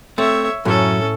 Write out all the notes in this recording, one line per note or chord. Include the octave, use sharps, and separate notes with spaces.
A3 C4 C#5 E5
F#2 A2 C#4 A4